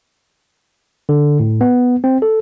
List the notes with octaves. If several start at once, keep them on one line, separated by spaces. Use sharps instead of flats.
D3
A2
B3
C4
A4